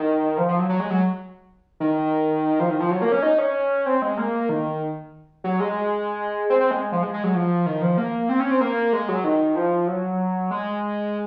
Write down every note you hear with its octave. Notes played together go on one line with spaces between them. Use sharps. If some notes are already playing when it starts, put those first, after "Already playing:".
Already playing: D#3
F3
F3
F#3
F#3
G#3
F#3
D#3
F3
D#3
F3
F#3
A#3
C#4
D#4
C#4
C4
G#3
A#3
D#3
F#3
G#3
C4
C4
G#3
F3
G#3
G#3
F#3
F3
D#3
F3
A#3
C4
C#4
C4
A#3
G#3
F#3
D#3
F3
F#3
G#3